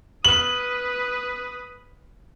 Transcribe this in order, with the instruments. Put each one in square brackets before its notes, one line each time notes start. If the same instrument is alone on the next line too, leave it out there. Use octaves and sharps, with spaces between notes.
[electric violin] B4 D#6 [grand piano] F#7